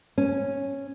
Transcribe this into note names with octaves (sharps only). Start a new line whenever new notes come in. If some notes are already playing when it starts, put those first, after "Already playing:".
C#4